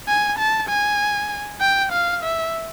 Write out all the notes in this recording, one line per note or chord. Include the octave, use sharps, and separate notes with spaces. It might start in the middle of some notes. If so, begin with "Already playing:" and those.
G#5
A5
G#5
G5
F5
E5